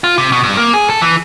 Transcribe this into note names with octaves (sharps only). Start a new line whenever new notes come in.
F4
C3
B2
G2
A#3
G#4
A4
E3